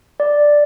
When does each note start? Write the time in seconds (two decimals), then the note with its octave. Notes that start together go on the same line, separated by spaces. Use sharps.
0.20 D5